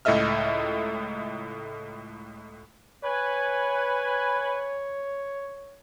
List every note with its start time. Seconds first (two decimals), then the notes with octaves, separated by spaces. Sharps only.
0.05 C#2 A2 A4 D#5 E5 F6
3.04 B4 C#5 G#5